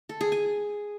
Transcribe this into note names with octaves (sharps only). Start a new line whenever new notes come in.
A4
G#4
G#5